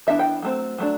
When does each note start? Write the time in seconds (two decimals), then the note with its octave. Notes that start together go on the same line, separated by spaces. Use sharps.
0.07 E3 B3 D4 E5
0.19 G5
0.42 F#3 A3 C4
0.78 F#3 A3 D4